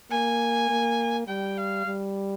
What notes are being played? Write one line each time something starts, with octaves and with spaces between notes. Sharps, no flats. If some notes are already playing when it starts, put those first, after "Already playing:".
A#3 G#5
A#3
G3 G5
F5
G3